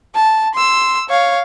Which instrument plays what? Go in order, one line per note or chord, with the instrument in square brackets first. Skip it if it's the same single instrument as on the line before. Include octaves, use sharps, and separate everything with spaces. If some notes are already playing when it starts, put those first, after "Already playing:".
[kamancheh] A5
C6 E6
C#5 F5